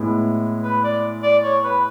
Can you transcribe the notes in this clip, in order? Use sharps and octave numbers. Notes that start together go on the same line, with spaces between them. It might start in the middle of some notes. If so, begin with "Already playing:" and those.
Already playing: A2 G#3 B3 E4
B4
D5
D5
C#5
B4